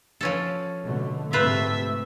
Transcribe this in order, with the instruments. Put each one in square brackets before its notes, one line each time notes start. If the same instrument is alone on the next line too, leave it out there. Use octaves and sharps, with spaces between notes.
[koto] F3 C#4 A4
[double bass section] B2 D3 A3
[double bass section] G#2 C3 A3 [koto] F4 B4 C5 [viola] E5